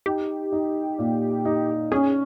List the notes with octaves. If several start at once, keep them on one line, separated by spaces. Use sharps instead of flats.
D#4 G4
D#4
A#2
D#4
C#4 G#4